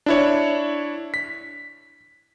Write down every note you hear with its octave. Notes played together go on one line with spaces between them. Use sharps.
D4 E4 C#5
B6